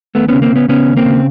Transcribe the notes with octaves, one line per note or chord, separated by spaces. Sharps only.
D#2 A3 B3
C#3 B3 C#4
A#3 C4
C#3 B3 C#4
C#3 B3 C#4
D#2
A#3 C4
C#3